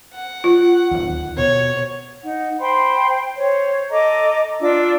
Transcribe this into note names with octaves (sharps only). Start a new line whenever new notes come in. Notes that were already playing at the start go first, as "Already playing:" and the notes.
F#5
F4
D1 D#2
B2 C#5
D#4 F#5
C5 G5 B5 C6
C5 C#5
A4 D#5 A#5 D6
D4 F4 D6 E6